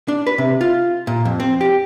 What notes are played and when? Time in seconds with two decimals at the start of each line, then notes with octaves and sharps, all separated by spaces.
0.08 D4
0.27 B4
0.38 C3
0.61 F4
1.07 A#2
1.25 F2
1.40 C4
1.61 G4